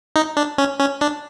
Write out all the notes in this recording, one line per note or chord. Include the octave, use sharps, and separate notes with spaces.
D#4
D4
C#4
C#4
D4